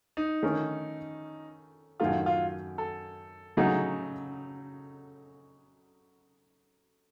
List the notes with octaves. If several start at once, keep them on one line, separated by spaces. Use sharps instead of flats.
D#4
D#3 A3 C#4
F#2 D#3 A3 F4
F4
A4
C#3 F#3 A3 D#4